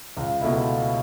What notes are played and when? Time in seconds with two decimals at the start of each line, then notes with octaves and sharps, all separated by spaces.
0.17 C#2
0.41 B2 A3 E4